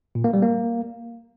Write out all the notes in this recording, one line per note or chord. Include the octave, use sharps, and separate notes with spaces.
A#2
A#3
G3
A#3